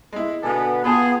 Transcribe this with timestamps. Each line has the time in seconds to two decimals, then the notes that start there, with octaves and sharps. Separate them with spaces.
0.13 G#3 E4
0.43 B2 D3 B3 A4 G#5
0.84 B3 F4 G#4 G5 A5 B5